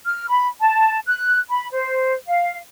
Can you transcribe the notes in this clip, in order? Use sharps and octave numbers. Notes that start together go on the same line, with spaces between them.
F6
B5
A5
F#6
B5
C5
F5